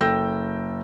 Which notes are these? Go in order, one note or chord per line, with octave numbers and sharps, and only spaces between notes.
F#1 A4 G5 E6 G6 A#6